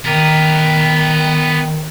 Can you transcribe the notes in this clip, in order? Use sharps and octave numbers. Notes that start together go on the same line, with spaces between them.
D#3 B3 A#4